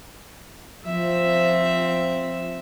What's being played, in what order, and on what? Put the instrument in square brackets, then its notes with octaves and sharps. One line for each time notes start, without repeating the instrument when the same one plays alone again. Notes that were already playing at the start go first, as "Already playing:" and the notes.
[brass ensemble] F3 [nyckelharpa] C4 E5